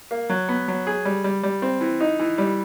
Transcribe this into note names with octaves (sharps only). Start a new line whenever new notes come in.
A#3
F#3
B3
F#3
G#4
G3
G3
G3
C4
E3
D#4
E3
G3